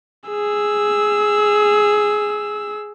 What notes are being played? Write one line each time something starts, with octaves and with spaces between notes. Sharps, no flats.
G#4 E6